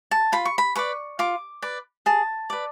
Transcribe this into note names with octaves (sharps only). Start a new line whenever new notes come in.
A5
F4 B5
C#6
B5
B4 D5 C#6
F4 D6
B4 D5
G#4 A5
B4 D5